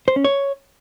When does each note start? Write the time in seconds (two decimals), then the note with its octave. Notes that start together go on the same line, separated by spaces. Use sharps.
0.08 C5
0.16 C#4
0.25 C#5